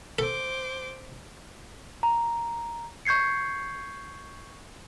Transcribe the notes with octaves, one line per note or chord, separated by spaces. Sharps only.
A4 C5 D6
A#5
C#6 G6 G#6 C7 C#7